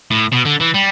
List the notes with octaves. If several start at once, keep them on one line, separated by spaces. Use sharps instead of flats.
A2
B2
D3
E3
G3